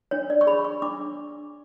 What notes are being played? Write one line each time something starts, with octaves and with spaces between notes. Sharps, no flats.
D4 C#5
D5
C#6
G#4 C#5 B5
C#6
D4 D6